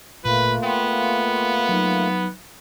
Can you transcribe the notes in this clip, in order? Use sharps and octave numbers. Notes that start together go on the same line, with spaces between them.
G1 A#2 A3 A#3 F4 B4
B3 G5 C6
F#3 D#4